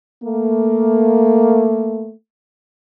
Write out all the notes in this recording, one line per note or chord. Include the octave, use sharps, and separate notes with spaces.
A3 A#3